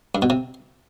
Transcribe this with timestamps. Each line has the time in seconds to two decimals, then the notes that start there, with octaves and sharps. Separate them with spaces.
0.15 G2
0.22 B2
0.30 C3